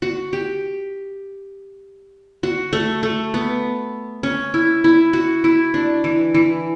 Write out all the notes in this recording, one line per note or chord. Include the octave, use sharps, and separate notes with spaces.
F#4
G4
F#4
A3
A3
B3
C#4
E4
E4
F#4
E4
D4
E3
E3